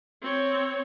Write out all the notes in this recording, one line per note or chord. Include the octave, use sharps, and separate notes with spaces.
C4 C#5